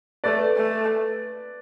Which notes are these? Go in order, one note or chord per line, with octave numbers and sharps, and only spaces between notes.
A3 B4 D5
A3